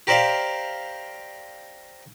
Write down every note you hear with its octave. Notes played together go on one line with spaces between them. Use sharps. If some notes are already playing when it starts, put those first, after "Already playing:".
G4 A#4 C5 D5 E5 F5